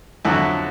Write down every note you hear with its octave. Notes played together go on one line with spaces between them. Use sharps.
F2 D3 F#3 E4 F#4